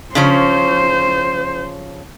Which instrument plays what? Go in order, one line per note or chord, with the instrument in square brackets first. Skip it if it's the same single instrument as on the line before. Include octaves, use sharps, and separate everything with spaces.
[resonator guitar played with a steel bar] C#3 F3 C#4 [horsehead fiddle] C5